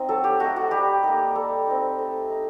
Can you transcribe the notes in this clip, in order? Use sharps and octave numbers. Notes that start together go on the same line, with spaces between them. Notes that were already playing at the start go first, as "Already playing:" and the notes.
Already playing: C4 D#4
F#3 A4
G4
A3 D#4 F#4
F#4
G3 G4
A#3 D#4
G3 A4
C4 D#4
A3
D#4